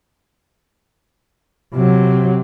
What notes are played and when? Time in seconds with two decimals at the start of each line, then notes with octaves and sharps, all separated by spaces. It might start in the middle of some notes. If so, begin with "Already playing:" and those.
1.74 C3 F#3